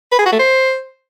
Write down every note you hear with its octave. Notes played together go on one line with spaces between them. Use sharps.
B4
G#4
F#4
A3
C5